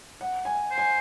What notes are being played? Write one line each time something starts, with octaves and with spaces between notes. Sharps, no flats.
F#5
G#5
C5
G#5